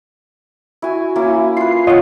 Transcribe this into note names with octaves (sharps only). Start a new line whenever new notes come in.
E4 F#4 G#5
A#3 C#4 E4
F4 B4 C7
B3 F4 C#5 D#5 F#5